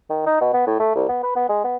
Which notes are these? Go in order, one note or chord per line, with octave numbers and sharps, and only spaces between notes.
D#3
D#4
B2
B3
A2
A3
C2
B3
B4
B3
G#3
B3